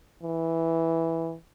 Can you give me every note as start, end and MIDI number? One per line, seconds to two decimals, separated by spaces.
0.23 1.35 52